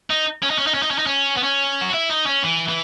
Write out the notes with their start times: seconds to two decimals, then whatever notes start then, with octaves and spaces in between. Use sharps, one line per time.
0.10 D#4
0.43 C#4
0.50 D#4
0.59 C#4
0.67 D#4
0.74 C#4
0.83 D#4
0.91 C#4
0.99 D#4
1.06 C#4
1.36 B3
1.43 C#4
1.81 F#4
1.93 E4
2.09 D#4
2.26 C#4
2.43 E3
2.68 E3